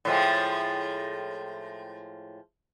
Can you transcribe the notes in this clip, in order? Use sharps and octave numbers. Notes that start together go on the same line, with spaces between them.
A2 F3 G#3